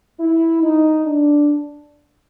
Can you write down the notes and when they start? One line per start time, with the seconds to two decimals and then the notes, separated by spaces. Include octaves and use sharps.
0.20 E4
0.62 D#4
1.05 D4